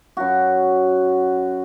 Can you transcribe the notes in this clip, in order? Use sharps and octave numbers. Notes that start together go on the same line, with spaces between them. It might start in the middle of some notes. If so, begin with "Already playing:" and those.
F#2 F#4